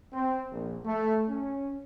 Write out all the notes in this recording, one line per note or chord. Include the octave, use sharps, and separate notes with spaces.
C4
A#1
A3
C#4